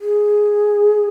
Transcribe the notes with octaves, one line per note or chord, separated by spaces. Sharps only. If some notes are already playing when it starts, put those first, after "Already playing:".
G#4